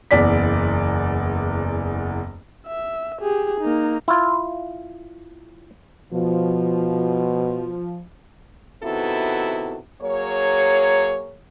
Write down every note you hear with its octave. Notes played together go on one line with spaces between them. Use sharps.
F#1 E2 D5 B6
E5
G4 G#4
A#3 D#4
E4 F4
B2 F3
C3 D#3 B3 E4 F#4 A4
F#3 A#3 G#4 C#5